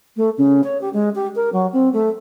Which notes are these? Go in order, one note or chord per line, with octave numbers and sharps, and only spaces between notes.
A3
C#3
C#5
G4
G#3
G4
A#4
F#3
C4
A3